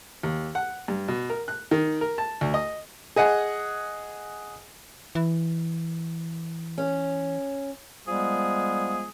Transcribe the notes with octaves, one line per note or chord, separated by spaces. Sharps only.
D#2
F#5
G2
B2
A#4
F#6
D#3
A#4
A5
D2
D#5
G#4 D#5 F#5 G#5
E3
C#4
F3 G3 G#3 B3 G#4